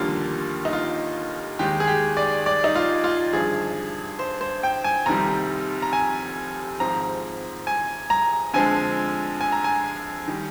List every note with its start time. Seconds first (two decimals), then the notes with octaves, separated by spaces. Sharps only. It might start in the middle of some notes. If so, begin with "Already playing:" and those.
Already playing: F1 D#2 D3 G3 A#3 F4
0.65 D#4
0.73 F4
1.59 D#2 D#3 G#3 G4
1.80 G#4
1.87 G4
2.17 D5
2.46 D5
2.64 D#4
2.75 F4
3.04 F4
3.33 G#1 G2 D3 F3 G#4
4.19 C5
4.41 C5
4.63 G5
4.84 G#5
5.06 F1 F2 C3 D#3 G3 A#5
5.82 A#5
5.93 G#5
6.80 G#1 G#2 F3 C4 A#5
7.67 G#5
8.10 A#5
8.53 F2 D3 F3 G#3 G#5
9.41 G#5
9.52 A#5
9.64 G#5
10.28 D#3 G3